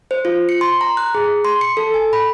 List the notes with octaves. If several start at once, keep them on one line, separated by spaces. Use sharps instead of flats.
C5
F4
C#7
C6
A#5
F#6
G#4
C6
C#7
A4
G#5
B5